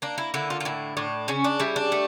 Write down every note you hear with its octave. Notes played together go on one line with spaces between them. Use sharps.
A#3 D4
E4
D3 E4
F4
F4
A2 E4
A2 D4
C#3 C#4
D4
G3 E4
D4
A3